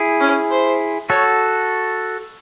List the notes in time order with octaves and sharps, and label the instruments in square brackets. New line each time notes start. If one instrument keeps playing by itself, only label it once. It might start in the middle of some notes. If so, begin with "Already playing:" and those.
Already playing: [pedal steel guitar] E4 G#4
[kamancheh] C#4
C5
[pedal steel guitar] F#4 A4 [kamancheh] C#5